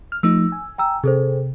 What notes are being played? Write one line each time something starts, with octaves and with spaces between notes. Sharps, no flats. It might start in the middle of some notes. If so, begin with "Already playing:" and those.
F6
F3 A3 D#4 E6
G#5
G5 A#5 E6
C3 G#4 A4 C5